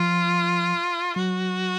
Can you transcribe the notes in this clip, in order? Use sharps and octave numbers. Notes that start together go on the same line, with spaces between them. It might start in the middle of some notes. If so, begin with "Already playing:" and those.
Already playing: F3 F4
F#3 F#4